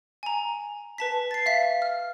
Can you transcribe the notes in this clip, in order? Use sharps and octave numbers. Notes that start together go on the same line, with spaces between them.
G#5 A#5
B4 A5 B6
A6 C7
E5 F5 B6
F6